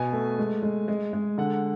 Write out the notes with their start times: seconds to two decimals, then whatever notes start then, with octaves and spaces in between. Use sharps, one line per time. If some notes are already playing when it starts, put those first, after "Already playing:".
Already playing: B2 G#5
0.13 A3
0.38 G#3
0.63 G#3
0.88 G#3
1.13 G#3
1.38 D3 F#5